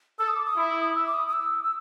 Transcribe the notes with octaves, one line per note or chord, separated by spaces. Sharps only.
A4 E6
D#6
D6
D#6
E4
E6
D6
D#6
D#6
E6
E6